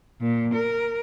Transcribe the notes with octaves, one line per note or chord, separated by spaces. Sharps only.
A#2
A#4